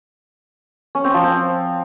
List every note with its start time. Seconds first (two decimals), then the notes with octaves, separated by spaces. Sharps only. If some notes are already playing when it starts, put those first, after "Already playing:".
0.95 C#4
1.04 C4
1.14 F3
1.24 C4